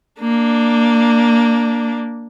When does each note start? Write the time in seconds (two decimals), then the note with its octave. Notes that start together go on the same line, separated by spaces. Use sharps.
0.20 A#3 D4